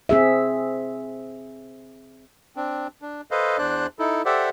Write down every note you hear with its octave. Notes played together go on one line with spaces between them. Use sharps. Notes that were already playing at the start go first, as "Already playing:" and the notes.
C4 G#4 E5
C4 D4
D4
A4 B4 C5 D#5 F5
E2 D4 C5 D5 F#6
D#4 E4 A4
G4 A4 C5 D5 E5 F#5